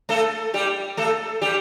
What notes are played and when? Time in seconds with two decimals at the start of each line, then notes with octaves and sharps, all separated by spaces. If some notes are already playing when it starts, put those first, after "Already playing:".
0.09 A3 A4
0.54 G3 G4
0.97 A3 A4
1.42 G3 G4